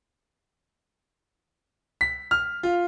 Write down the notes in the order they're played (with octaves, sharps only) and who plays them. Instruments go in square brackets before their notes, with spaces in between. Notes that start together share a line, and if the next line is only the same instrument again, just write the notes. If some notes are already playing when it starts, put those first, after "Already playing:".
[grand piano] B6
F6
F4